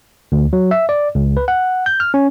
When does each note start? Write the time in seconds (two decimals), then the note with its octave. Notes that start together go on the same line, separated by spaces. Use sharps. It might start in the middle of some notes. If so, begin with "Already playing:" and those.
0.32 D2
0.53 F#3
0.71 E5
0.89 D5
1.15 C#2
1.37 B4
1.48 F#5
1.86 G6
2.00 F6
2.14 C#4